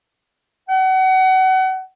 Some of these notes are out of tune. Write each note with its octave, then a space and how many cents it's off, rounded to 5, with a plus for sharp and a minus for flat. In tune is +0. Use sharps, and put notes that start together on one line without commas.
F#5 +30